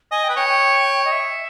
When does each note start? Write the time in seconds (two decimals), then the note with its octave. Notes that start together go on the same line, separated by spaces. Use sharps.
0.11 D#5 G#5
0.24 G5
0.29 B4
0.36 C#5 G5
0.49 G5
1.05 D#5
1.12 E5